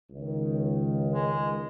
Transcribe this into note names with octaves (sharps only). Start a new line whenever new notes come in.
C#2 D#3
G#3